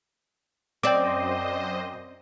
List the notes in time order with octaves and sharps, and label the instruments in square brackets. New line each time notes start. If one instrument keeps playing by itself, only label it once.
[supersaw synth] F#2 C5 D#5 [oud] C4 D5 [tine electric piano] G5 D6